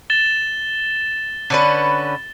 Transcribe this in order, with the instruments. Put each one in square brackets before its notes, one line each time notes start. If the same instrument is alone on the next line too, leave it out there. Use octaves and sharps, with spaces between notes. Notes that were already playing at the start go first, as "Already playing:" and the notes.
[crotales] A6 E7 G7
[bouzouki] D3 C#4 B4